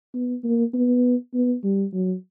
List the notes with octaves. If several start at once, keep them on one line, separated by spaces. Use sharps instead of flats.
B3
A#3
B3
B3
G3
F#3